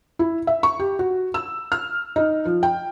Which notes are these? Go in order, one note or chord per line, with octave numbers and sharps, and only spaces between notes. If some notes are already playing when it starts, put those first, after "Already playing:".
E4
E5
C#6
G4
F#4
E6
F6
D#4
F3
G5